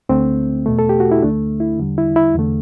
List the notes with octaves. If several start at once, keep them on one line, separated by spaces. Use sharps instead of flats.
D2 D3 A3 C4
E2 B2 A3
A4
G4
F#4
E4
D2 D3 A3 D4
E4
E2 D3 G3
E4
E4
E2 D3 A3